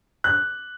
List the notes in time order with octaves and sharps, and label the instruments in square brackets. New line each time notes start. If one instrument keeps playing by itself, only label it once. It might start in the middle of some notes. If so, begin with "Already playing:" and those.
[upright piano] F#6